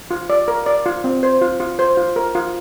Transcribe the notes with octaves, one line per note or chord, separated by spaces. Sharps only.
F4
D5
A#4
D5
F4
C4
C5
F4
F4
C5
F4
A#4
F4